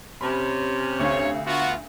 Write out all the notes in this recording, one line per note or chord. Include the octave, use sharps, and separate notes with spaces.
C3 C#4 B5
D2 C#5 F5
B3 F4 F#4